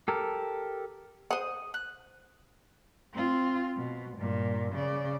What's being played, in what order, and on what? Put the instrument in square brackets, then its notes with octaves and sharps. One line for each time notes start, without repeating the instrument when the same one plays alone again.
[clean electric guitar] G4 A4 A#4
[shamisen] C5 F#5 [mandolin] D#6
[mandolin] F#6
[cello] C4 F4
B2
G2 A#2
C#3 D5